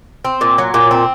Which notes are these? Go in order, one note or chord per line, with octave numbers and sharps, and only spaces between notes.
C4
A#2
F#3
A#2
C4